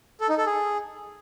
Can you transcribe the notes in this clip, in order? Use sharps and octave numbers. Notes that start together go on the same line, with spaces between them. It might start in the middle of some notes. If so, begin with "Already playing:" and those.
A4
D#4
A4
G#4